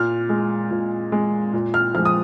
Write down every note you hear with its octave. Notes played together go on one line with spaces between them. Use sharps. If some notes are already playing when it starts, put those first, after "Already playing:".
Already playing: A#2 F6
G#3
A#2
G#3
A#2
F6
F3 G#3 F6
D#6